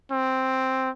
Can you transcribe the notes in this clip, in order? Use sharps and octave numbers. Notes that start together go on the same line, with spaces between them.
C4